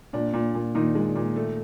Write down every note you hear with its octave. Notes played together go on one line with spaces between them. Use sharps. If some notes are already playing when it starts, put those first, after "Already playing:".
A#2 D4
A#2
A#2
A#2 D#3 D#4
G#3
A#2
A3